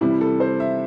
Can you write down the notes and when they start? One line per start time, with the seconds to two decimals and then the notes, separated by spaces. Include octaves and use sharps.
0.01 C3 E3 G3 E4
0.21 A4
0.40 C5
0.60 E5